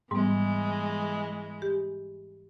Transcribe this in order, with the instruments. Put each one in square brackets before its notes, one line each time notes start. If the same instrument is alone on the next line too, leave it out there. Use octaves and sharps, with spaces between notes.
[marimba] G#2 G3 B3 [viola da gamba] E3 G#3
[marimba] G4